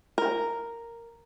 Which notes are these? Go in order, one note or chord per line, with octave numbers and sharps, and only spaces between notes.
A#4